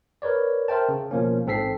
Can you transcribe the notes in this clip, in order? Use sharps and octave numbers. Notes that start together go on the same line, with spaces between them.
A#4 B4 C#5 D5
A#4 C5 E5 G5 A5
C#3
B2 F3 A#3 C#4
A1 G#2 C4 A4 B6 C7